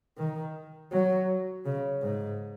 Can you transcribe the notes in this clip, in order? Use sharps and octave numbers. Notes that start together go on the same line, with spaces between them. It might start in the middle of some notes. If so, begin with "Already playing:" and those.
D#3
F#3
C#3
G#2